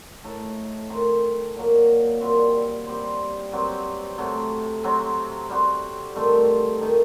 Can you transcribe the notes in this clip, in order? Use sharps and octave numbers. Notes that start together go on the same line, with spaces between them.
A2 A3 D#4 A4
D#3 A3 C4 D#4
A#2 F#3 A#3
A#2 G3 C4 F#4
G3 C4 G4 C5
G2 F#3 C4 G4
C3 F#3 A3
C3 F#3 C4
G3 C4 F#4 C5
G2 D#3 A3 C4
D#3 A3 D#4